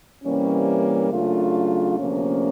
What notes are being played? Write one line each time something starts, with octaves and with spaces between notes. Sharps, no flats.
C3 E3 G3 A#3 C#4
C#3 F#3 A3 D4 F4
D2 C3 F3 A#3 C#4